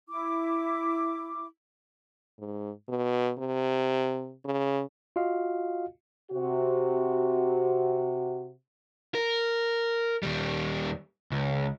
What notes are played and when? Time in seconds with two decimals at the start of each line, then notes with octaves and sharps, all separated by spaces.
0.09 E4 D6
2.39 G#2
2.89 B2
3.38 C3
4.45 C#3
5.16 F4 F#4 D#5 F5
6.32 C3 F#4
9.15 A#4
10.23 D#2 G3
11.32 C#2